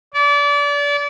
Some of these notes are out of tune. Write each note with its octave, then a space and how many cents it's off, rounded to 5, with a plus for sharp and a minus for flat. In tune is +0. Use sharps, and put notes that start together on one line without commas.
D5 -30